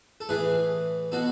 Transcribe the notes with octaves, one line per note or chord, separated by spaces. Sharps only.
A4
A2 E3 G#4 B4
B2 F#4 A4